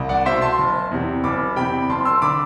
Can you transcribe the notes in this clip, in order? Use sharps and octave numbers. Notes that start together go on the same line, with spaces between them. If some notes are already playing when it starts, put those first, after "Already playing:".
Already playing: C2
D5 F#5
B2 C5 E5
A5 C6
F#1
E2 C3
F#1 B5 D6
E2 C3 G5 B5
F#1 A5 C6
C6 E6
D3 B5 D6